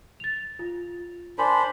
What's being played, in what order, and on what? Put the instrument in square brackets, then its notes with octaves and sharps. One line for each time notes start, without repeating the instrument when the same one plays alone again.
[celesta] A6 F7
F4
[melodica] D4 C5 B5 [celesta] A#4 G#5